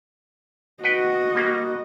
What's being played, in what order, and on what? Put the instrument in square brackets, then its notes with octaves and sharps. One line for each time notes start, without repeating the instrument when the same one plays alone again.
[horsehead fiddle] F#4 D#5 [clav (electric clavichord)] B4 F#5 G5
[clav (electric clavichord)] G3 A#3